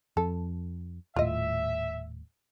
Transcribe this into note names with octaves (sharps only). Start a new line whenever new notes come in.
F2 A4
D#1 A2 F4 D#5 E5